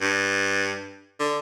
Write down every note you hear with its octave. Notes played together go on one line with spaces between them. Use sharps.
G2
D3